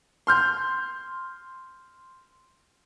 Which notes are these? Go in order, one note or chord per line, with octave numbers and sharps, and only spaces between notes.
C6 F6 G6